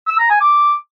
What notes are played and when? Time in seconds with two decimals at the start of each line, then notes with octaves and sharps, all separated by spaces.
0.07 E6
0.19 A#5
0.30 G#5
0.41 D6